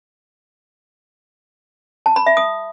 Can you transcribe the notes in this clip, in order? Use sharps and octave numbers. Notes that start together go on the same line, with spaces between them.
A5
B5
E5
D#6